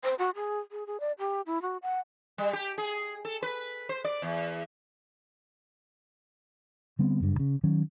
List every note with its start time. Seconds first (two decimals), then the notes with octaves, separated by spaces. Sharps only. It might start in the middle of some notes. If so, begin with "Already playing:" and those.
0.04 C5
0.19 F#4
0.36 G#4
0.72 G#4
0.87 G#4
1.00 D5
1.19 G4
1.46 E4
1.62 F#4
1.83 F#5
2.38 G3
2.53 G4
2.78 G#4
3.25 A4
3.43 B4
3.89 C5
4.05 D5
4.22 E2
6.99 D3 G3 B3 C4
7.20 F#1 G2
7.39 C#3
7.63 D#3 F#3 C#4